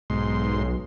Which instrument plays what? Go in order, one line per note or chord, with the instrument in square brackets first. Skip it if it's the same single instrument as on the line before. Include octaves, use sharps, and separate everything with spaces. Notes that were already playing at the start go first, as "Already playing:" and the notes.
[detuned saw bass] B1 [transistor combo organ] G#2 C6